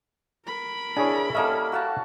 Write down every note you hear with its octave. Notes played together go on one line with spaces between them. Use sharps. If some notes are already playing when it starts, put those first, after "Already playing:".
A#4 B5
D4 E4 G#4 C#5 G#5
G3 A#3 C#4 A4 D#5 E5
F#4 F5 A5